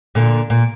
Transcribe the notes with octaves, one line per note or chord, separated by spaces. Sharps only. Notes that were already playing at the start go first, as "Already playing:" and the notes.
A#2 D3
A#2